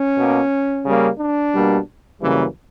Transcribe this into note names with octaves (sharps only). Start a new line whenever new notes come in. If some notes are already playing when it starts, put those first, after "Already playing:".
Already playing: C#4
B2 A#3
C#3 G3 A#3
D4
B2 G3 A#3
F#2 C#3 E3 G3 A#3